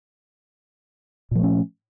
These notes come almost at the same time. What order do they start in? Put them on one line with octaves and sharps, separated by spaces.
A#2 F3 A3 C#4